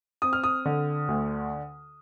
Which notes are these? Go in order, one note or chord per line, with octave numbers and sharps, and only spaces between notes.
C4 D#6
F6
D#6
D3
D2